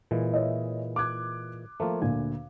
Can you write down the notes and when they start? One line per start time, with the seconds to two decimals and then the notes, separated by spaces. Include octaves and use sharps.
0.11 A#2 E3 G#3
0.33 C#5 D#5 E5
0.96 D6 F#6 G#6
1.80 F3 A3 A#3 F4
2.02 D2 A#2 G#5